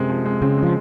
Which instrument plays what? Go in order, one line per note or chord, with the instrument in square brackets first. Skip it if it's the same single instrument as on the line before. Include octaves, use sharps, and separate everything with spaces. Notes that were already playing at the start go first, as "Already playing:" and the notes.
Already playing: [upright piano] F#2 G#3 [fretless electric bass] C3
[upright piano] F3
G#3
[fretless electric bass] C#3 [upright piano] C4
[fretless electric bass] F3 [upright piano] G#3